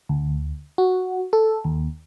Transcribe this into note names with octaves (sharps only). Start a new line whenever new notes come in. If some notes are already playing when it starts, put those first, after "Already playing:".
D2
F#4
A4
D#2